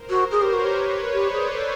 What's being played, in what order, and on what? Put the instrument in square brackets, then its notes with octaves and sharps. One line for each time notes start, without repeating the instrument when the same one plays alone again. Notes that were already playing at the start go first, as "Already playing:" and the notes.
Already playing: [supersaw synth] A#4 C5
[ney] F#4
[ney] G#4 [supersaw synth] B4 C#5
[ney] G4
F#4
G4
[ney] G4 [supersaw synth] C5 D5
[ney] G#4
A4